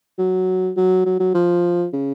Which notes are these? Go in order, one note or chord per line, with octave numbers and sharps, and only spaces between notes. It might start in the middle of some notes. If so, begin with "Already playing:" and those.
F#3
F#3
F#3
F#3
F3
C#3